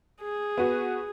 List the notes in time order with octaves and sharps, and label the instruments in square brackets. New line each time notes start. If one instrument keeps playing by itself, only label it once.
[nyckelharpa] G#4
[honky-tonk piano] B3 F#4